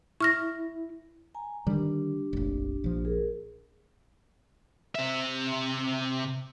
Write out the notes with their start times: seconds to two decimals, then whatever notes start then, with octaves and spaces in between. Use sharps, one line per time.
0.21 E4 C#6 F6 A#6
1.35 G#5 A#5
1.67 D3 D#3 G3 D4 G4
2.33 F1 A#1
2.84 A#1 F3
3.05 G#4 A#4
4.95 C3 E5